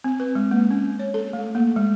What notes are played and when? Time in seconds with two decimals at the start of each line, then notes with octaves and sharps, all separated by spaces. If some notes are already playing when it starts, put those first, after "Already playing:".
0.04 C4
0.20 B4
0.35 G#3
0.51 A#3
0.71 C#4
0.99 C#5
1.14 A4
1.33 A3
1.55 A#3
1.76 G#3